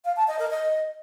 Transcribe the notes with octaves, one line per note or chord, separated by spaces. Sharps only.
F5
A5
D#5
A#4
D#5